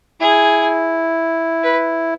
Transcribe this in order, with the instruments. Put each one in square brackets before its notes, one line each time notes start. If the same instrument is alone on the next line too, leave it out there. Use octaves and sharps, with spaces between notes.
[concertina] E4 [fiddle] G#4
[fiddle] B4